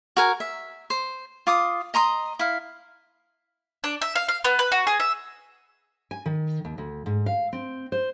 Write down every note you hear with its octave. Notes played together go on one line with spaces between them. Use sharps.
F#4 A#4 G#5
E5
C5
F4 D6 D#6
D#5 A#5 C6 D#6
E4 F5
D4
E5
F5
F5
B3
B4
F#4
G#4
E5
G#5
D#3
D#2
D2
G#2
F5
C4
C5